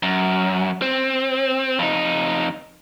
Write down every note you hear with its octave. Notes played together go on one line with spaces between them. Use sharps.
F#2
C4
F2 D#4